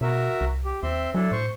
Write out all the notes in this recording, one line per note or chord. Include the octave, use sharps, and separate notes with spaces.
B2 F#4 A#4 E5
C2
G4
D#2 C4 E5 C6
F#3 D4 E4 A4
A2 C5 C#6